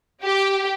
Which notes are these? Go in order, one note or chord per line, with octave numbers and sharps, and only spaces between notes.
G4